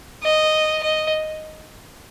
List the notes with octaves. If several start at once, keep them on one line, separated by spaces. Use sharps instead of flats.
D#5
D#5